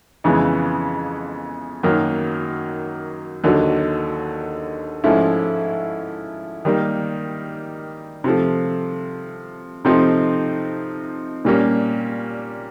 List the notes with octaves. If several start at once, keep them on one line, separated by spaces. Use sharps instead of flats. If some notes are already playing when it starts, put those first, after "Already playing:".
F2 C#3 E3 G#3 B3
F#2 D#3 F#3 A#3
D#2 D3 F#3
G#2 F3 A3 C#4 E4
D#3 G3 A#3
C3 F3 A3
C3 F3 A3 C4 D#4
A#2 G3 A#3 C#4